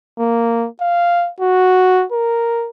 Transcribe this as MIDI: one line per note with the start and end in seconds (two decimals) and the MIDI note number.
0.19 0.67 58
0.81 1.30 77
1.40 2.05 66
2.12 2.70 70